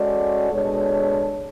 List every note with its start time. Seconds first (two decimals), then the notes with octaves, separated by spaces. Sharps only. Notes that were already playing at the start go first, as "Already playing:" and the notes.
Already playing: G#3 C#4 F#4 A4 D5
0.50 B2 G#3 D4 A4 C#5